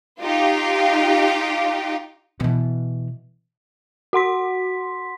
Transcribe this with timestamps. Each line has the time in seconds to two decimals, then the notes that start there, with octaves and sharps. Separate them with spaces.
0.21 D#4 F4 G4
2.40 B2 E3
4.13 F#4 F#5 C6 B6